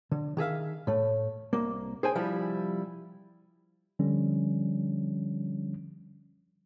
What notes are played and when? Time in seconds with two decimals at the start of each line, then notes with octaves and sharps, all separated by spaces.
0.12 D3
0.37 D#3 G#4 E5 F5
0.87 A2 A3
1.53 C2 A#3
2.03 G#4 C5 G5 G#5
2.15 C3 F3 G3 E4
3.99 D3 F3 G3 C#4